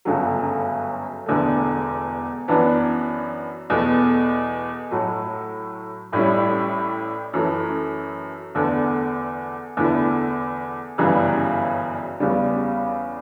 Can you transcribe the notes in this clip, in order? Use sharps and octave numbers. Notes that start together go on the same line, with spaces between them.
G1 F#2 C#3 F#3 A3
E1 E2 D3 A3
F#2 E3 B3 D4
E2 B2 A3
A2 F#3 A3
A1 A2 G3 C#4 E4
F#2 E3 A3
E2 D3 A3
E2 D3 A3 E4
G1 F#2 C#3 E3 G3
E2 C#3 G3